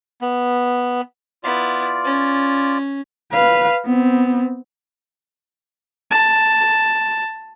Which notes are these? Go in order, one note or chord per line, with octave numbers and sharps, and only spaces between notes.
B3
B3 E4 F4 D5
C#4
B4 F5
B3 C4
A5